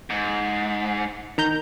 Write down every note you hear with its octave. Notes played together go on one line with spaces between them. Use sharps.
G#2
D#3 A#5 G6